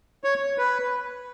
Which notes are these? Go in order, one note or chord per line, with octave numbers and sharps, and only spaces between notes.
C#5
B4